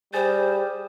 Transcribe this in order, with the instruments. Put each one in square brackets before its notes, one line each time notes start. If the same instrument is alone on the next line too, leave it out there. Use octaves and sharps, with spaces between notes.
[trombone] G3 [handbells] G#4 G#5 A6 [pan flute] C5